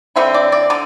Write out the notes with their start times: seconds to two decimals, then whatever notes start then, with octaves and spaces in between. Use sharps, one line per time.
0.16 D3 A3 C4 E4 E5
0.34 D5
0.52 D5
0.70 D3 D5